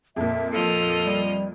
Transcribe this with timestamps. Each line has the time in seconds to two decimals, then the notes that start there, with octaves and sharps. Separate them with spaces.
0.16 F2 A#2 E5
0.52 F3 A4 D#5 F6
1.06 G3